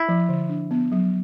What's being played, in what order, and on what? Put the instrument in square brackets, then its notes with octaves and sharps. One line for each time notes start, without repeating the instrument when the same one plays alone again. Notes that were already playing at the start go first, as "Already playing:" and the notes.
Already playing: [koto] E4
[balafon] F3
D3
D4
B3
F#3